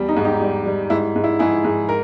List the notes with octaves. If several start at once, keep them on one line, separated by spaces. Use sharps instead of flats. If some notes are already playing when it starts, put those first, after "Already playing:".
Already playing: E2 G3
D#4
G#2
D#4 G4
G3
G3
G#2 E4
G#2
E4
G#2 E4 G#4
G#2
A#4